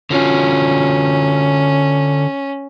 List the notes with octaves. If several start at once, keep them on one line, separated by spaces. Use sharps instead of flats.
D3 C#4 F4 F#4